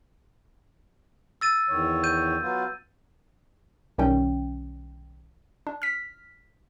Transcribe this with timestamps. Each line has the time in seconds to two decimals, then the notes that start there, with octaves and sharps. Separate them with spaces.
1.41 E6 A6 D#7
1.69 E2 D#3 C#5
2.04 G6 D#7
2.42 F#3 B3 F4
3.98 B1 D#3 G3 C#4 G5
5.67 D4
5.82 F6 B6